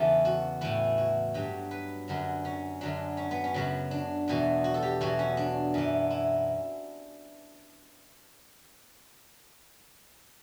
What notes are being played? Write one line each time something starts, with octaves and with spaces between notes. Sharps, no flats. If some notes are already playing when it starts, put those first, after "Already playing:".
Already playing: E2 C#3 E3 A4
F#4
A2 E3 E4
F#4
G2 F#3 G4
B4
F#2 D3 F#3
C#4
F#2 D3 F#3 D4
C#4
B3
C#4
F#2 C#3 F#3
D4
E2 B2 F#3
F#4
A4
G4
E2 B2 F#3 F#4
C#4
D4
F#2 E3
E4